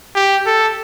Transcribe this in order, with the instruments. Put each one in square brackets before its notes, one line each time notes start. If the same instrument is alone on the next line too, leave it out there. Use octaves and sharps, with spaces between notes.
[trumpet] G4
A4